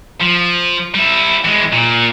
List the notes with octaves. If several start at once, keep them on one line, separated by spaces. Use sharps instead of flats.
F3
G3 E4
E3 G#3
A#2